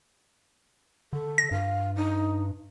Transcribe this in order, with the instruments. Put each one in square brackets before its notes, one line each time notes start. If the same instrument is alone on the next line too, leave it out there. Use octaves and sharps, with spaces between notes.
[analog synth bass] D3 [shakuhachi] A4
[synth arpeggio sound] A#6
[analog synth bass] G2 [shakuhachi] F5
[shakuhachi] D#4